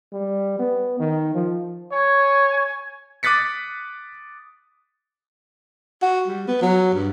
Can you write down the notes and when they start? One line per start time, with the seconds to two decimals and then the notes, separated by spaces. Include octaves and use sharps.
0.13 G3
0.59 B3
0.99 D#3
1.34 F3
1.92 C#5 G#5
3.23 D6 D#6 F#6 A6 B6 C#7
6.02 F#4
6.28 G3
6.48 B3
6.62 F#3
6.93 G2